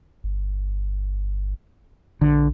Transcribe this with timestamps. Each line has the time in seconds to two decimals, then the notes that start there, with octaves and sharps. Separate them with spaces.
0.24 G1
2.21 A#1 D3